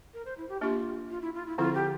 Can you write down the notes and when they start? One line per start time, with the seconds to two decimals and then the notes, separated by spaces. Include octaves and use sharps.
0.13 A#4
0.25 C5
0.37 E4
0.49 G4
0.61 A#3 D4 F4 G4
1.10 F4
1.22 E4
1.34 F4
1.47 E4
1.58 D3 F3 C4 E4 F4 A4
1.74 G4